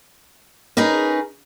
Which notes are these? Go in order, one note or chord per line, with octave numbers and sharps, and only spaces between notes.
C#4 D#4 G#4 A#4 B4